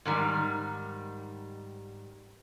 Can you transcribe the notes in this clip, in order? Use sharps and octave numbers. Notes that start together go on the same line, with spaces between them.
G#2 D#3 G3